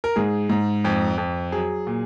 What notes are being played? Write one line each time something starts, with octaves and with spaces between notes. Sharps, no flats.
A#4
G#2 G#4
G#2
F2
F2
F#3 G#4
A#2